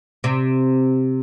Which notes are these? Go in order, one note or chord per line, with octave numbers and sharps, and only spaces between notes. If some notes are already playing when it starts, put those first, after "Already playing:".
C3